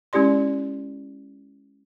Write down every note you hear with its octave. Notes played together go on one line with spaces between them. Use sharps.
G#3 C#4 E4 G4 D5 C6